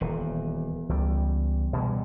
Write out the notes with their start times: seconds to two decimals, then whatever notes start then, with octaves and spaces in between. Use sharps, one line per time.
0.01 D#1 E2
0.89 C#2 G3
1.73 B2 G3 G#3